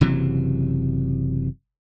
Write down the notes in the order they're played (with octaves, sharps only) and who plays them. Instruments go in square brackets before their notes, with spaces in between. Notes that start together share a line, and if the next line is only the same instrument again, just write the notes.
[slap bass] F#1 C3 E3 F#3